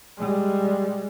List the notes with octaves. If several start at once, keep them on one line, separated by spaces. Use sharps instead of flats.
G3 G#3